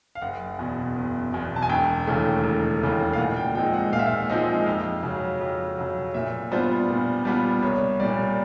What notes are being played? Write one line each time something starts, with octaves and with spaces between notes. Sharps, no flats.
F5
F#1 F#5
E2 B2
F#1
E2 B2
A5
G#5
E1 G5
D#2 C#3 E3 A3
E1
D#2 C#3 E3 A3
F5
A#2 F#5
G5
F3 G#3 C4 D#4 G5
F#5
A#2 F5
E5
F5
F3 G#3 C4 D#4
F2
C#3 F#3
F2
C#3 F#3
A#2 E5
G3 B3 D4 F4 C5
A#2
G3 B3 D4 F4
C2 C#5
A#2 G3 D5